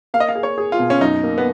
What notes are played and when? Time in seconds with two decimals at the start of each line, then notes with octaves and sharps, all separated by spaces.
0.14 A#3 F5
0.20 D#5
0.29 F5
0.35 G#4
0.43 C#5
0.58 G#4
0.72 F4
0.79 B2
0.90 C#4
1.01 F#2 D#4
1.23 A#3
1.38 B3